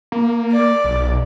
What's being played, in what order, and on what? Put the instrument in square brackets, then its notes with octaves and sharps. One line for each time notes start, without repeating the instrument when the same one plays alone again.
[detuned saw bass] A#3
[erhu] D5
[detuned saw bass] B1